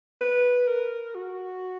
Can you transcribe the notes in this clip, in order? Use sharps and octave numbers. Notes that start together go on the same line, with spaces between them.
B4
A#4
F#4